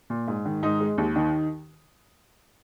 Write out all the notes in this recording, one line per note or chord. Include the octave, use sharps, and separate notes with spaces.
A#2
G#2
D#3
G#2 D#4
G#3
D#2
D#3